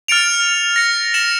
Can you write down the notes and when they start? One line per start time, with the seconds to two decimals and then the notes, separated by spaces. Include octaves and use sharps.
0.08 F6 A6 C#7 D7 F7
0.76 A#6 C#7
1.14 A#6 C#7 E7 F#7